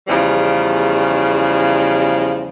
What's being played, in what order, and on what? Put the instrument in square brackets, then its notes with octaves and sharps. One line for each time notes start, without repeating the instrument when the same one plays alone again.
[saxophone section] E2 C#3 F3 G3